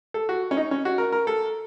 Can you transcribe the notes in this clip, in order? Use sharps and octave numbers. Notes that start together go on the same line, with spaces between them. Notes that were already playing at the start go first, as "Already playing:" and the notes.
A4
F#4
C#4
D#4
C#4
F#4
A#4
A#4
A4